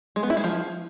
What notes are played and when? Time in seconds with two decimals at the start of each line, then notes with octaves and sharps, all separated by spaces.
0.16 G#3
0.23 B3
0.30 E4
0.37 G#3
0.44 F3